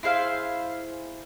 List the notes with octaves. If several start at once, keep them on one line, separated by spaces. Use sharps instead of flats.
E4 G#4 C5 F5